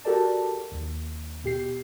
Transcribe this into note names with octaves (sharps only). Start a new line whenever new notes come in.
F#4 G4 A4 A#4 D5 A5
D#2
B2 G4 C7